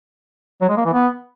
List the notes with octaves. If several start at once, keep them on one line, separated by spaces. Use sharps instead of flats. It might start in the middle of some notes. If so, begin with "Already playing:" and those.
F#3
G#3
A#3
E3
B3